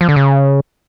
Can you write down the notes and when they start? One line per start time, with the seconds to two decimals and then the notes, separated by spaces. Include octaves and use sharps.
0.01 F3
0.09 D3
0.16 C#3